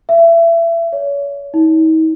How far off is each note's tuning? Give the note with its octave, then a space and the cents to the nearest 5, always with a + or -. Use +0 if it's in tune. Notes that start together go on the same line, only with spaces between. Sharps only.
E5 +30
C#5 +35
D#4 +45